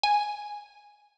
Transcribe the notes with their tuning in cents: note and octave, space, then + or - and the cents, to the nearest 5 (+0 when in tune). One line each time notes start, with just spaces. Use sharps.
G#5 +0